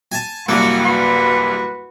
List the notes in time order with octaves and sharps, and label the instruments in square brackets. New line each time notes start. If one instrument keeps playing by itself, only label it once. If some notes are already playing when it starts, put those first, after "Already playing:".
[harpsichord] G#5 A5
[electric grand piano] C2 F#2 G3 [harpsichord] A#3 [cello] F#4
[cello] F#4 B4